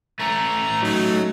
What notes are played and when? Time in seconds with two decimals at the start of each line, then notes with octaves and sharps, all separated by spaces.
0.20 A3 C#4 A#5
0.82 F#3 D#4